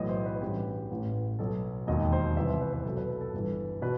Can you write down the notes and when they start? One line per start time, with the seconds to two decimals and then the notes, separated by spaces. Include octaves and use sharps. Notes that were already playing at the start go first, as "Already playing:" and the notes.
Already playing: B1 A2 E3 D#5
0.09 C5
0.26 B4
0.41 A1 G2 E3 G4
0.91 A1 A2 E3
1.39 B1 B2 A4
1.87 E1 D#2 D#3 D#5
2.12 C5
2.36 C2 C3 E3 E5
2.49 C5
2.61 B4
2.72 B4
2.84 B1 B2 A4
2.97 B4
3.09 A4
3.21 A4
3.33 G1 G2 E3
3.82 B2 B4